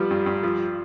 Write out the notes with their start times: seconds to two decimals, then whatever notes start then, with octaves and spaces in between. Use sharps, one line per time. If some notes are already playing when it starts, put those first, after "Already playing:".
Already playing: F3 G3 B3
0.11 G2
0.26 G2
0.43 F3